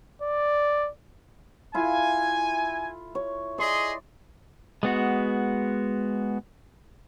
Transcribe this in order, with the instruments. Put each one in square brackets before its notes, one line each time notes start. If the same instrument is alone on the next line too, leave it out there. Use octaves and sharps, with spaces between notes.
[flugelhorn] D5
[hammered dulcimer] E4 F4 A4 [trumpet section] G#5
[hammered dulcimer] C#5
[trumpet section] G#4 D#5 C6 [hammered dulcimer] D5
[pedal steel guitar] G#3 B3 F#4